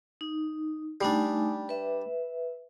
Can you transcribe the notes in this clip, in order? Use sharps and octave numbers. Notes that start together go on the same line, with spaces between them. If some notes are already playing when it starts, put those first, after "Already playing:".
D#4
G3 A3 D4 D#4 G#5
B4 E5